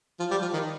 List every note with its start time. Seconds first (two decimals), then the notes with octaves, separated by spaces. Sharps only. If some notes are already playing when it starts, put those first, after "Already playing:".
0.20 F3
0.31 G3
0.42 F3
0.53 D#3